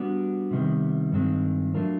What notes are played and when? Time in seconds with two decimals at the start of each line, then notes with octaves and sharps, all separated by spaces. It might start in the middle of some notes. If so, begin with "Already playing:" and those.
Already playing: G3 B3 D4 F#4
0.51 C3 D#3 G3 B3
1.12 G2 D#3 G#3 C4
1.74 F#3 A3 D4 F4 A#4